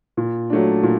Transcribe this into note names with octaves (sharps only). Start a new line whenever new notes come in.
A#2
F#3 A3 D4
A#2